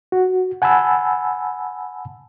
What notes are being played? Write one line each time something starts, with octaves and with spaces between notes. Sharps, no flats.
F#4
F#5 G#5 A5 B5 E6